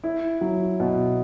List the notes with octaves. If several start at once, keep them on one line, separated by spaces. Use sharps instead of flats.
E4
F#3
B2